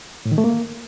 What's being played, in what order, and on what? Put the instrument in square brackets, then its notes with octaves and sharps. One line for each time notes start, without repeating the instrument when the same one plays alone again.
[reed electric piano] A2
D#3
A3
A#3